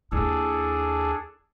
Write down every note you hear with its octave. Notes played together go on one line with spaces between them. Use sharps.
D#2 D4 E4 G#4 A4